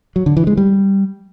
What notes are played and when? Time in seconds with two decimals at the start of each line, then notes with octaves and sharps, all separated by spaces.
0.16 F#3
0.26 D3
0.37 E3
0.47 G#3
0.57 G3